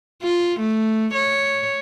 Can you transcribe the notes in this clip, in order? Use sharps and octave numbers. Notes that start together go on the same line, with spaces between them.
F4
A3
C#5